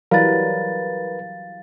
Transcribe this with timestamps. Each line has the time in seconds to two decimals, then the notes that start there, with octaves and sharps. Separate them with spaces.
0.11 E3 F#3 G3 A#4 B4 F5 A6